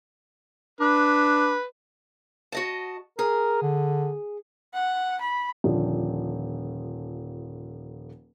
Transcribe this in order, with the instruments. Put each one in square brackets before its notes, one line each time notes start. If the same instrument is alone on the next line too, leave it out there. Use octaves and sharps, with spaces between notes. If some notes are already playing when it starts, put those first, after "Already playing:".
[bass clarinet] D4 [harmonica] B4
[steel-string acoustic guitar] F#4 D#5 A5
[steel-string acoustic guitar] G#4 [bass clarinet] A#4
[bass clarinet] D3
[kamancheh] F#5
B5
[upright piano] D#1 D3 F3